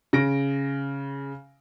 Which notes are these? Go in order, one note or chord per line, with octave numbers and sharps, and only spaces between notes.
C#3 A#6 D7